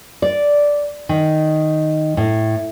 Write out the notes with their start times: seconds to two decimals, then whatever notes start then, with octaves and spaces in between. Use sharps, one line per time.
0.22 D5
1.09 D#3
2.17 A2